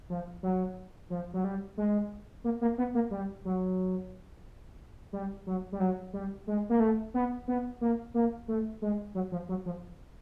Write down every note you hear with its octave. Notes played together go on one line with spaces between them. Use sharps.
F3
F#3
F3
F#3
G3
G#3
A#3
A#3
B3
A#3
G3
F#3
G3
F#3
G3
F#3
G3
G#3
A#3
A3
B3
B3
A#3
A#3
A3
G#3
F#3
F3
F#3
F3